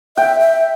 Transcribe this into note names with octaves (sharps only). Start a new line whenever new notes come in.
E5 G5
E5